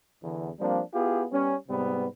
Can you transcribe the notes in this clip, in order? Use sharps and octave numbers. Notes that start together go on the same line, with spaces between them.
E2 D3
F3 G3 A#3 C4 D4
B3 E4 F4 G4 G#4
G3 B3 C#4
G#2 C3 G3 B3